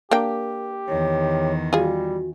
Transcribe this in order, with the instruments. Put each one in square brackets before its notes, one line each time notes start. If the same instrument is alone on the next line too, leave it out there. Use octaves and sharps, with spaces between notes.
[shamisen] A#3 D4 G5 [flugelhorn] G4 [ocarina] A#4
[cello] E2 D#3 [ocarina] C#5
[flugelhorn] G3 [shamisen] F4 G#4 [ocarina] F#4